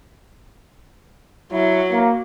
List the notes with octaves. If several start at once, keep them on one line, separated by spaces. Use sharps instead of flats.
F#3 E4
A#3